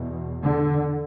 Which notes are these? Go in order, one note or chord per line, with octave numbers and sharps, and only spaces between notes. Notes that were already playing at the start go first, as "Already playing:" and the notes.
Already playing: E2 B2
D3